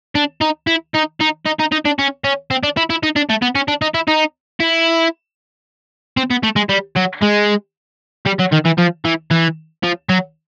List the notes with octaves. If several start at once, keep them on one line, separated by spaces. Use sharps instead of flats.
D4
D#4
E4
D#4
D#4
D#4
D#4
D#4
D4
C#4
C#4
C4
D4
E4
E4
D#4
D4
A3
B3
C#4
D4
D#4
E4
D#4
E4
C4
B3
A3
G#3
G3
F#3
G#3
G3
F#3
D#3
E3
F3
E3
E3
F3
F#3